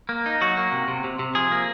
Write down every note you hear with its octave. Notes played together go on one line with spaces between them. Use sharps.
A#3
D#4
F#3 F#4
A#3
C3
C3
C3
C3
F3 G#4
A#3